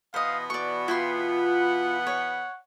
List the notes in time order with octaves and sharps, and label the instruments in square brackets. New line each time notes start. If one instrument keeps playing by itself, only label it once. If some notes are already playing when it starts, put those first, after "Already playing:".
[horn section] B2 E3 B3 [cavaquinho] C5 D#5 [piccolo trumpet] F5
[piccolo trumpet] F#4 [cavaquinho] D5 C#6
[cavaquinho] E4 G5 C6 [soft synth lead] F4
[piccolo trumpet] F#5
[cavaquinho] C#5